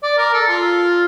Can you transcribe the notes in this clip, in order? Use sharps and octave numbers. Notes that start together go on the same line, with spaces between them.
D5
A#4
A4
F4